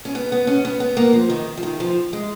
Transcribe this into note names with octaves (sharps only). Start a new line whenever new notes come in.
C#4
B3
B3
C#4
B3
B3
A#3
F3
D#3
F3
D#3
F3
G#3